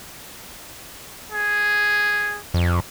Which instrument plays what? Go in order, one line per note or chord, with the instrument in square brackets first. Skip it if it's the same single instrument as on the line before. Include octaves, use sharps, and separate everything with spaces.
[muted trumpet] G#4
[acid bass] F2